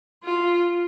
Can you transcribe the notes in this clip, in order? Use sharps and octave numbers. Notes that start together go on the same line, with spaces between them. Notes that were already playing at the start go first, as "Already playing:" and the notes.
F4